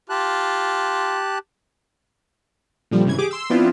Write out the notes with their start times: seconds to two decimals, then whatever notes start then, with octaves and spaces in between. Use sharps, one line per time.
0.10 F4 G4 A5 F#6
2.91 A#2 D3 F3 G3
3.05 C2 G#2 C#3 E3 G#6
3.18 G4 G#4 D6
3.31 C6 E6
3.50 F3 B3 C4 D4 E4 F4